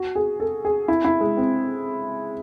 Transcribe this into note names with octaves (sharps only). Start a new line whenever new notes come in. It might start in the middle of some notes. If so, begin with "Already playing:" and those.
Already playing: F#4
G#4
A4
G#4
E4
E4
G#3
C4